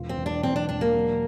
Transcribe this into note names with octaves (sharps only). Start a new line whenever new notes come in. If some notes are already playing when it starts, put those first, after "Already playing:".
Already playing: E1 F4
C4
E1
D4
E2 C4
D4
E1 D4
A#3
F#3